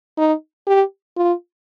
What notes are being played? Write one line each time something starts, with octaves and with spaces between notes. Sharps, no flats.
D#4
G4
F4